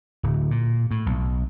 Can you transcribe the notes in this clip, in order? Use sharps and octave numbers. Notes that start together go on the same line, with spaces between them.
D1
A#2
A2
B1